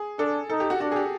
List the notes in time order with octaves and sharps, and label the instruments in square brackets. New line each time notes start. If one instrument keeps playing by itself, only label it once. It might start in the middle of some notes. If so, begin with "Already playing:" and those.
Already playing: [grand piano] G#4
[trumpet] D4 [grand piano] A4
[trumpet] D#4 [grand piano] A4
[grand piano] G4
F#4
[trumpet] D4 [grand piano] F#4
[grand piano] G#4
G4